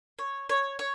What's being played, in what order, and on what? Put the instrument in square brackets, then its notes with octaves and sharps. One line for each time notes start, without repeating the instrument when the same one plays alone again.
[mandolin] C#5
C#5
C#5